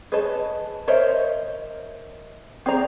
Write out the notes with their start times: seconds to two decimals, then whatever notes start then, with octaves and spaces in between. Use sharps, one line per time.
0.12 G#4 B4 C#5 D#5 A5
0.88 A#4 C5 C#5 D#5 E5
2.66 C4 G#4 D5 A#5